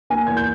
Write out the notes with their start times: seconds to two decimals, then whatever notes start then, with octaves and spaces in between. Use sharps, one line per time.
0.10 A#3 G#5
0.27 E2 G#6
0.37 G6